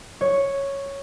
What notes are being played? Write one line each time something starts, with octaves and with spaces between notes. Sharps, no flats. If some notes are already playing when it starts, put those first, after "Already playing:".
C#5